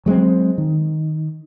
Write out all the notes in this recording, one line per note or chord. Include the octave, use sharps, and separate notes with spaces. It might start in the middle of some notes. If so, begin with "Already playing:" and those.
F#3 G#3 A#3 C4
D#3